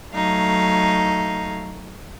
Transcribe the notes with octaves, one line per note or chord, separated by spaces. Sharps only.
F#3 A3 D#4 F5